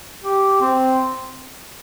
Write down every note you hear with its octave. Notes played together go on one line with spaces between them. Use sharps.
G4
C4